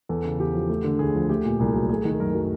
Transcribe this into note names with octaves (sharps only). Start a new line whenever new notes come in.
E2 A4
C#3
E2 G4
F3
A3
D3
D2 G#4
F3
A3 G4
A#2
C2 G#4
F#3
A3 G#4
D#3
F#2 A#4
F#3